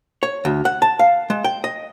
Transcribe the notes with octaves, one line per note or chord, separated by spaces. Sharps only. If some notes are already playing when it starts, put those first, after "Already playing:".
C#5
D2
F#5
A5
F5
G#3
G5
D#5